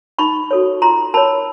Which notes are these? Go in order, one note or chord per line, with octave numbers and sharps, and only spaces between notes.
D#4 B5 C#6
F#4 A4 C#5
F4 A#5 C6
A#4 C#5 A5 B5